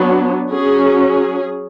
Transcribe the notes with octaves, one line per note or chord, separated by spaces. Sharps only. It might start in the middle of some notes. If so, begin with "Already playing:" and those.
Already playing: F#3 B3 D4
F#3 C#4 G#4
G#4